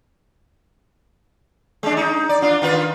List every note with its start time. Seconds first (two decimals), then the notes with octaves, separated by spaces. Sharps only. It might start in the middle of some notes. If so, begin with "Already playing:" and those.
1.83 G#3 D4
1.97 D#4
2.29 D5
2.42 D4 F4
2.62 D#3 F4 B4